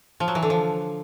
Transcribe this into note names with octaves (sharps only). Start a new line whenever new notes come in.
F3
F#3
E3
D3
F3